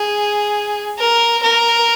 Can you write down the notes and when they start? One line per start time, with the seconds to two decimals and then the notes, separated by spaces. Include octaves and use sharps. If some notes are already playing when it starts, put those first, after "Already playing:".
Already playing: G#4
0.99 A#4
1.43 A#4